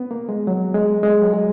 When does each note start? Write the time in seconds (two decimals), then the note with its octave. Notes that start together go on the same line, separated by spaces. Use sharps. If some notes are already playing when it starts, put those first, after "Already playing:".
Already playing: B3
0.11 A#3
0.29 G#3
0.47 F#3
0.75 G#3
1.03 G#3
1.22 F#3
1.33 G#3